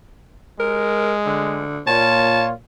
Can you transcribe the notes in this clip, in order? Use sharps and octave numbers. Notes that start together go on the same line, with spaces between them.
G#3 A#4
D3
A#2 F4 C#5 A5